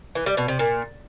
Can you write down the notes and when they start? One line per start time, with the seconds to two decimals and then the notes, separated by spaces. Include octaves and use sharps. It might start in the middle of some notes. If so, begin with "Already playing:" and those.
0.15 E3
0.26 G3
0.37 B2
0.48 C3
0.59 A#2